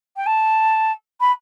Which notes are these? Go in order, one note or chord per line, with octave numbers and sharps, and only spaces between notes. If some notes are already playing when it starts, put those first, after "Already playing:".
G5
A5
B5